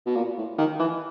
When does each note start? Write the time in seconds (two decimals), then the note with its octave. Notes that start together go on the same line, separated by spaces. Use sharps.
0.06 B2
0.16 A#2
0.38 A2
0.58 D#3
0.80 E3